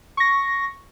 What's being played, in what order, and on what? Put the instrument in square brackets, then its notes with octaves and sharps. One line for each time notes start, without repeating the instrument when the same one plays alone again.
[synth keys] C#6 A#6